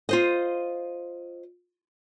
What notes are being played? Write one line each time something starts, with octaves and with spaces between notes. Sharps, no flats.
F4 C5 D#5